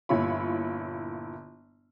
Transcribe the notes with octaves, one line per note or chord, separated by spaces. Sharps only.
G1 A#2 E4 F4 C#5 B5